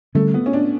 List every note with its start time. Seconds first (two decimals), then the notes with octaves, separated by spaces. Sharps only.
0.15 D3 G3 A3 C#4
0.34 B3
0.46 C#4
0.53 D4